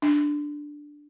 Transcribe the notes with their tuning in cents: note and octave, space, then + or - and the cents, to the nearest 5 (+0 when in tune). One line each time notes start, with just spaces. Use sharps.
D4 +0